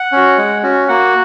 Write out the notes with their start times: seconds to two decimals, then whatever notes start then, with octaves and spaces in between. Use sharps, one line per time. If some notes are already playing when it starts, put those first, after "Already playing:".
Already playing: F#5
0.12 C#4 F#4
0.38 G#3
0.63 C#4 F#4
0.88 A#3 F#4 F#5